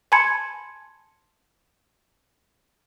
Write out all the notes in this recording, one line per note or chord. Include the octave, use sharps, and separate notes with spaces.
G#5 A5 B5 C6 G#6 C#7